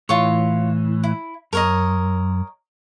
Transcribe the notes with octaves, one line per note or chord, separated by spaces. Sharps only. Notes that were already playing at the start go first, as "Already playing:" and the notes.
A2 E3 F4 C#5
E4
F#2 A#4 C#5 D#5